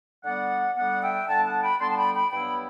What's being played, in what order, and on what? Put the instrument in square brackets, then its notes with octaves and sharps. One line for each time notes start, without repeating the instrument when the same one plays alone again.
[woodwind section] D3 G3 B3 D5 F#5
D3 G3 B3 D5 F#5
E5 G5
D3 G3 B3 F#5 A5
F#5 A5
G5 B5
D3 G3 B3 A5 C6
A5
G5 B5
G5 B5
G2 F#3 B3 E4 G5 B5